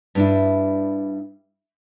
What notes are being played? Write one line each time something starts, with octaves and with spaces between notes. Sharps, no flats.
G2 D4 E4